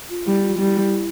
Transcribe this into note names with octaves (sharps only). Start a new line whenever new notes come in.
F4
G3 E4
F4
G3 E4